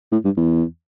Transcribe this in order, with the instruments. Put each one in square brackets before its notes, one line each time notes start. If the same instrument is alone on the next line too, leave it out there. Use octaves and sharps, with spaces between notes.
[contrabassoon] A2
G2
E2